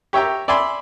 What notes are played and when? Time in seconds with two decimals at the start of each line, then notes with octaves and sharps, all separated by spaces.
0.13 G4 C#5 E5 G5 A#5
0.48 D5 E5 G#5 B5 C6